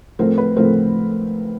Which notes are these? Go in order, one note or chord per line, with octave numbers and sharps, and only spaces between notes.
A2 F3 A3 C4 A#4 C5
B4
A2 F3 A3 C4 A#4 C5